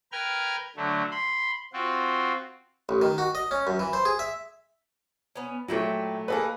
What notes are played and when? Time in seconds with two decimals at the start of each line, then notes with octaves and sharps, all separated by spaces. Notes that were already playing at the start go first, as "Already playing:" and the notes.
0.12 A#4 B4 G5 F6 G#6
0.77 D3 F#3 A3
1.11 B5 C6
1.73 C4 F4 F#4
2.89 A1
3.02 D#3
3.18 F#4
3.35 D#5
3.51 C#4
3.67 F#2
3.79 E3
3.93 C5
4.05 G#4
4.19 E5
5.36 B3 C#4
5.68 A#2 F#3 A3 E4 G5
6.28 A#3 D#4 F#4 G#4 A4 B4